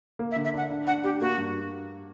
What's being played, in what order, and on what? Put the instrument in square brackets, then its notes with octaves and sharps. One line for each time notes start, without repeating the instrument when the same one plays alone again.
[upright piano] A#3
[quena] E5
[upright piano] D3
[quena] E5
[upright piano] D4 [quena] F#5
[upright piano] D4
[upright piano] D4 [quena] F#5
[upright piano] D4 [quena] G4
[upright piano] A#3 [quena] F#4
[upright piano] G2